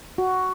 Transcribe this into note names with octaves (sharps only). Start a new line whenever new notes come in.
F#4